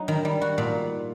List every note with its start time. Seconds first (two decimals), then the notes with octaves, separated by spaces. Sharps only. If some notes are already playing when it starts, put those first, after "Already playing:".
Already playing: F#3 D#4
0.08 D#3
0.25 G3
0.41 F#4
0.58 A#2